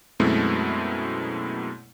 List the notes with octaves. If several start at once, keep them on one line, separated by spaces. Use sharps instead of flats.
F#2 B2 G#3 A3 C4 E4